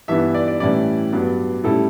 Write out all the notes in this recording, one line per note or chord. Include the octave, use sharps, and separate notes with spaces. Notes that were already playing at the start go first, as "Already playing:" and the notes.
G2 E3 B3 D4 E5
D5
D5
A2 E3 G3 C#4 E4 D5
G2 F#3 B3 D4
A2 G3 C#4 E4 A4